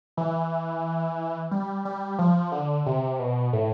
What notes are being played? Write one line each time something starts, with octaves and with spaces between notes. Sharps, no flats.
E3
G3
G3
F3
D3
C3
B2
A2